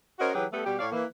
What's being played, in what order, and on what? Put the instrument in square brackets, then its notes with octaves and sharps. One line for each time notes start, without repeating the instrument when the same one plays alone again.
[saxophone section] C#4 F#4 A#4 C5 D#5
E3 F#3 G4 G#4 B4
G3 A3 B3 A4
B2 G3 G4
A2 C#5 D5 F5
E3 A#3